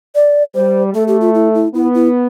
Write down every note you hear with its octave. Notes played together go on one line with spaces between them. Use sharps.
D5
G3 C5
A3 A4
G4
F4
E4
E4
B3 E4
E4